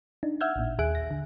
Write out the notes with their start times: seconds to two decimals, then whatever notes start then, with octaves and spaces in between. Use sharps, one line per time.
0.23 D4 D#4
0.41 E5 F#5 E6 F6 G6 G#6
0.56 A1 A#2
0.79 D#2 G#4 E5 G#5 F#6 D7
0.95 A#6
1.11 D3